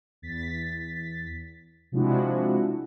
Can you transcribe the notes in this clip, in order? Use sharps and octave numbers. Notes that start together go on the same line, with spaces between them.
E2 A6 B6
C3 F3 G#3 D4 E4 F#4